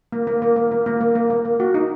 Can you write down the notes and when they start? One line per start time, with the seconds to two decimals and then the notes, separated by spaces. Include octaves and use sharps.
0.12 A#3
0.27 A#3
0.42 A#3
0.56 A#3
0.71 A#3
0.86 A#3
1.01 A#3
1.15 A#3
1.30 A#3
1.45 A#3
1.60 F#4
1.74 D#4